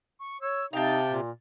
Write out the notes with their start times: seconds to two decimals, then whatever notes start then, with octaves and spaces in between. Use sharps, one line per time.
0.20 C#6
0.41 C#5 E6
0.73 C3 D#4 F5 G5 A5
1.09 A#2